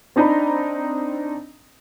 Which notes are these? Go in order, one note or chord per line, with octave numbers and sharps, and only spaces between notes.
C4 D4 D#4 D#5 A#5 B5